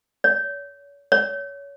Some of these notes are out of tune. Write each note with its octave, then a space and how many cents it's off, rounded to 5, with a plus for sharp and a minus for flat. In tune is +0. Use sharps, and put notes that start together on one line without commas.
C#5 +35
C#5 +20